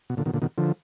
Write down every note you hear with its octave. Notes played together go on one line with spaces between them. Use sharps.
B2
A#2 D3
B2 D#3
A#2 D3
B2 D#3
D3 F3